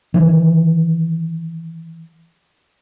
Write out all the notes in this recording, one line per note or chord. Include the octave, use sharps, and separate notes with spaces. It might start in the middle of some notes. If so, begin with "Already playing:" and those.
D#3 E3 F#3